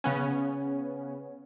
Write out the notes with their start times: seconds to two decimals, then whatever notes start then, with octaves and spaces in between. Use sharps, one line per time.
0.04 C#3 B3 C#4